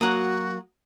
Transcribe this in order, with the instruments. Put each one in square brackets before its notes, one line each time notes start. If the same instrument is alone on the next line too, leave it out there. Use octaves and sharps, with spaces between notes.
[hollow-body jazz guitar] F#3 A#3 [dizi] F#4 [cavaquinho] F#5 A#5 D#6